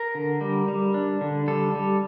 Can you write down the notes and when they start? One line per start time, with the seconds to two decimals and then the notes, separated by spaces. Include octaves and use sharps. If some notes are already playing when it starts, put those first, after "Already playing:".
Already playing: A#4
0.15 D3
0.41 G3
0.68 G3
0.94 D4
1.21 D3
1.48 G3 A4
1.75 G3